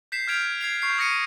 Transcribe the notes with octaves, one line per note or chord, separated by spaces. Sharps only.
G6 B6 C7 E7
F6 G6 G#6 D7 F7
G#6 C7 F7
C#6 G6 C7
D#6 A#6 C#7 D#7